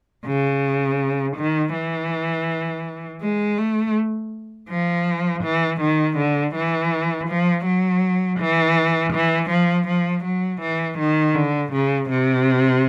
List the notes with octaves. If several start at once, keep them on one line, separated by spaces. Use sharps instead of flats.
C#3
D#3
E3
G#3
A3
F3
E3
D#3
D3
E3
F3
F#3
E3
E3
F3
F3
F#3
E3
D#3
D3
C#3
C3